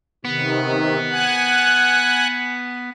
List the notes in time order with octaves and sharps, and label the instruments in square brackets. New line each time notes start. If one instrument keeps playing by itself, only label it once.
[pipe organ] C3 D#3 [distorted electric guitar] B3
[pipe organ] F#5 G#5 F#6